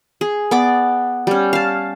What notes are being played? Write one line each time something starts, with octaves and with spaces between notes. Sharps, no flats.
G#4
B3 D5 D6
G3 C#4
F5 A5